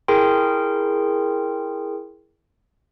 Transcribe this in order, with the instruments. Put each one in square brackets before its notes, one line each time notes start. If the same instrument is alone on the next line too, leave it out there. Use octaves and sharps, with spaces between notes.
[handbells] E4 G#4 A#4 G5 C6